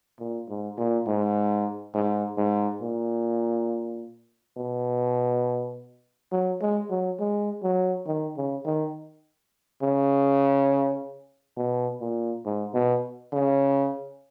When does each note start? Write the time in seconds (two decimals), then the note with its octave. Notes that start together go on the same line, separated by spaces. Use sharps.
0.19 A#2
0.49 G#2
0.78 A#2
1.07 G#2
1.94 G#2
2.38 G#2
2.82 A#2
4.57 B2
6.32 F#3
6.61 G#3
6.90 F#3
7.20 G#3
7.63 F#3
8.07 D#3
8.37 C#3
8.65 D#3
9.82 C#3
11.57 B2
12.01 A#2
12.45 G#2
12.74 B2
13.33 C#3